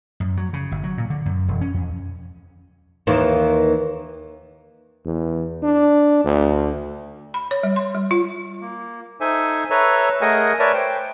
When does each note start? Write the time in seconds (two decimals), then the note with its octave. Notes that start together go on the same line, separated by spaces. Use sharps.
0.20 F#2
0.37 F#3
0.53 C#3
0.71 G1
0.84 F#3
0.98 A#2
1.10 D3
1.25 F#2
1.48 E1
1.61 C#4
1.74 F2
3.07 D#2 D#3 E3
5.05 E2
5.62 D4
6.25 D2
7.34 B5
7.51 C#5
7.63 G3
7.76 C6
7.95 G3
8.11 F4
8.61 A#3
9.20 D#4 A4 C5 E5 G#5
9.70 A4 B4 C#5 E5 A#5 E6
10.21 A3 G#4 A#4 D#5 F#5 G#5
10.59 A#4 B4 C#5 D5 E5 A5
10.74 C5 G5